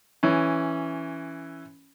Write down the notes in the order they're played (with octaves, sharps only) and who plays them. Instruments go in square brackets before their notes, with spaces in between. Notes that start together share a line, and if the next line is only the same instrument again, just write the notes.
[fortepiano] E3 C#4